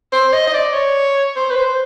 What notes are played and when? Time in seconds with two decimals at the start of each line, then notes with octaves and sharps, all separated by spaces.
0.12 C5
0.33 D#5
0.47 D#5
0.54 D5
0.73 C#5
1.36 C5
1.50 B4
1.56 C5